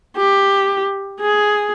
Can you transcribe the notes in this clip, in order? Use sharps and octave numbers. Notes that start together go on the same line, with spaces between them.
G4
G#4